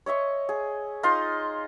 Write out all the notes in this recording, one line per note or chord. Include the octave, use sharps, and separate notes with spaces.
C#5 D#5 E5 C#6
G#4
D#4 F4 D#5 C6